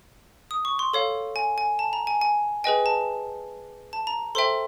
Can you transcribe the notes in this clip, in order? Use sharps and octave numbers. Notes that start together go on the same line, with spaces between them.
D#6
C#6
C6
A4 C#5 F5
G#5
G#5
A5
A#5
G#5
G#5
G#4 B4 D#5 G5 G#5
A5
A5
A#5
A4 C5 E5 G5 C6